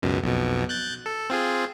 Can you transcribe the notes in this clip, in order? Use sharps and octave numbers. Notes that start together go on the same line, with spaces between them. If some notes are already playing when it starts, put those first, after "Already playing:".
C#2 F#2 B2
B1 F2 B2
F#6 G6 A6
A4
C4 F4 G#4